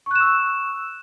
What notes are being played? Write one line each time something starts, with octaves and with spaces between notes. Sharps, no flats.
C#6 E6 F#6 E7